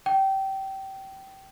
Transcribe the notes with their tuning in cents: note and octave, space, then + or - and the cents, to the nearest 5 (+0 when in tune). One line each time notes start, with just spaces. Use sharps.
G5 -20